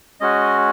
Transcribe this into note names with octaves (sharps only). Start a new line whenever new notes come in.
G#3 C#4 F#4 D#5